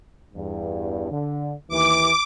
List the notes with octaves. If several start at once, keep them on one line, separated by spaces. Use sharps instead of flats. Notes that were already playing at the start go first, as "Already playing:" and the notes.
E2 G2
D3
D#2 E3 D6